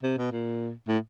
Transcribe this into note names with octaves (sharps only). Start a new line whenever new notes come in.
C3
B2
A#2
A2